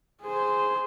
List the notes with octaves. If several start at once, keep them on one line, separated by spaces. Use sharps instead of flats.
G#4 C5